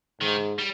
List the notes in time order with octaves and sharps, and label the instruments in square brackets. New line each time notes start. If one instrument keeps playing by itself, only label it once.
[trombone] G#2 [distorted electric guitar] D#3
[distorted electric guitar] G3